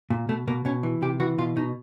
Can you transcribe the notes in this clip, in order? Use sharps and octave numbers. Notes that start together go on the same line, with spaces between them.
A#2
B2 A3
B2 A#3
B2 C#4
E3
C3 G4
E3 F#4
B2 F4
B2 D#4